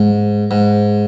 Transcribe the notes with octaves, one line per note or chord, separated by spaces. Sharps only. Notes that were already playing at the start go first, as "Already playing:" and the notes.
Already playing: G#2
G#2